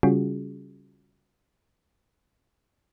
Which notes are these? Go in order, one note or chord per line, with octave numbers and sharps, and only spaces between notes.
C#3 G3 C#4 F4 F#4 G#4